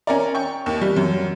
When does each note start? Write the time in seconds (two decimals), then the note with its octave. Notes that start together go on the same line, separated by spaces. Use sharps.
0.07 C#4 A#4 D5
0.35 G5 C#6
0.66 D#2
0.81 G3
0.96 F#2